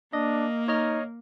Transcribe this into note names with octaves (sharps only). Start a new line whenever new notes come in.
A#3 D4 D#5
D#4 C#5 D#5 F6